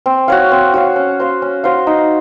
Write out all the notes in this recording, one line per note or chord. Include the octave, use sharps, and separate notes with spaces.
C4
F#4 C#5 F5
C4
F#4 C#5 F5
C#4
F#4 C5 F5
C#4
F#4 C5 F5
D#4